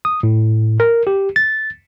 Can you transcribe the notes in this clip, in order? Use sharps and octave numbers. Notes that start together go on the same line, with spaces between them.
D#6
A2
A#4
G4
A6